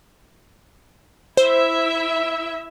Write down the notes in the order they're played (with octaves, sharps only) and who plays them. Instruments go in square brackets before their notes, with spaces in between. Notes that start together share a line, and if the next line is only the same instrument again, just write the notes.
[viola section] E4 E5 [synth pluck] C5